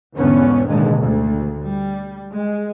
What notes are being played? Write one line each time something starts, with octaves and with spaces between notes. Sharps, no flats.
E2 G#2 B2 D3 B3 C#4
A1 D#2 B2 D3 D#3 G#3
D2
G3
G#3